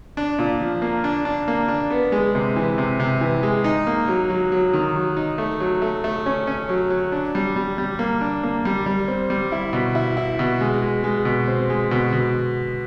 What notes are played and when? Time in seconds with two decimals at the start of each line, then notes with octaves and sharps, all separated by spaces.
0.17 D4
0.38 A#2
0.61 F3
0.82 A#3
1.04 D4
1.25 D4
1.48 A#3
1.68 D4
1.90 B3
2.12 G#3
2.35 C3
2.56 E3
2.78 C3
3.00 C3
3.21 E3
3.43 G#3
3.64 D#4
3.87 A#3
4.08 F#3
4.30 F#3
4.52 F#3
4.73 D#3
4.96 F#3
5.17 D#4
5.38 A3
5.60 F#3
5.82 A3
6.04 A3
6.26 C#4
6.47 C#4
6.69 F#3
6.90 F#3
7.12 D4
7.35 G3
7.56 G3
7.78 G3
7.99 A#3
8.21 D4
8.43 A#3
8.65 G3
8.86 G3
9.08 C4
9.30 G3
9.52 E4
9.73 B2
9.95 E4
10.17 E4
10.39 B2
10.60 G#3
10.82 G#3
11.04 G#3
11.25 B2
11.48 C4
11.70 G#3
11.91 B2
12.12 B2